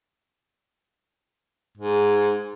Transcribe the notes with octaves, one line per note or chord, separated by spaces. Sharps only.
G#2